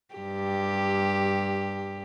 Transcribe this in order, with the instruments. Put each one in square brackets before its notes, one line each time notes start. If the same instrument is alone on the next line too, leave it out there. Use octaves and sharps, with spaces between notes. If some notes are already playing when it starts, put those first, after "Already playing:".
[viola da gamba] G2 G4